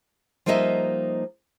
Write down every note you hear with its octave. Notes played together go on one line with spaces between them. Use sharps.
F3 G3 A#3 D#4 D#5 E5